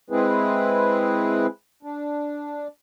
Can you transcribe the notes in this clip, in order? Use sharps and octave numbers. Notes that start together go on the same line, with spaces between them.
G#3 C4 E4 G#4 B4
D4